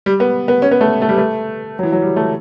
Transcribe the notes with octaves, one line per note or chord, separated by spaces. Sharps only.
G3
B3
B3
C#4
B3
A3
A3
G3
A3
F#3
E3
F#3
G3
A3